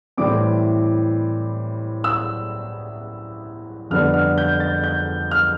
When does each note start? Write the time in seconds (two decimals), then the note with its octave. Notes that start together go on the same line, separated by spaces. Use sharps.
0.17 A2 E3 G3 C4 D6
2.04 E6
3.90 F2 D3 G3 B3 D4 F6
4.14 F6
4.38 G6
4.60 A6
4.84 G6
5.31 F6